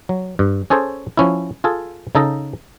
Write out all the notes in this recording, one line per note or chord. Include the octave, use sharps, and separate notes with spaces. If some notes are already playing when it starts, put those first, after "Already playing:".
F#3
G2
C#4 G#4 A4 C5 C#5
F3 C#4 E4
F4 G#4 A4
C#3 D#4 A4 D#5 A#5